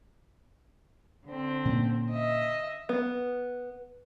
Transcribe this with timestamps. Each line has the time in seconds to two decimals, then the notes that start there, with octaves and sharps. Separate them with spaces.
1.26 D3 C4
1.65 A#2 A#3 C#4
2.11 D#5 E5
2.89 B3